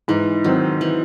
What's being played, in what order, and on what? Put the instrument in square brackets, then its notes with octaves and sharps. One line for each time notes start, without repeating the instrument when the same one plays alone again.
[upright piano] G#2 [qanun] E3
[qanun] D#3 [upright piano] F#3 C4
[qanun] E3